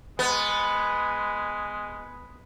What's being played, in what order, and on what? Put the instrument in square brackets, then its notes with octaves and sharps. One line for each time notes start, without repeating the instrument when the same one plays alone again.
[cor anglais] G#3 [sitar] B3